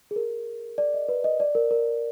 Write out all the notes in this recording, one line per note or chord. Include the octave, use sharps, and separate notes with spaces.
G#4
A#4
D5
D#5
B4
D#5
D5
A#4
A#4